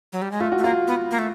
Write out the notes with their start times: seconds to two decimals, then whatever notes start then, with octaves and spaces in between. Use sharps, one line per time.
0.13 F#3
0.22 G3
0.31 G#3
0.40 A3 F4
0.52 F#4
0.58 A3
0.64 A#3 F4
0.87 B3
1.11 A#3
1.18 A3